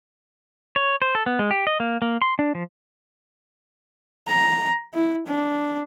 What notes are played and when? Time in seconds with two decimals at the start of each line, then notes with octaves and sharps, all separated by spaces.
0.76 C#5
1.02 C5
1.15 A4
1.26 B3
1.39 G#3
1.51 G4
1.67 D#5
1.80 A#3
2.02 A#3
2.22 C6
2.39 D4
2.55 F3
4.27 A#5
4.94 E4
5.27 D4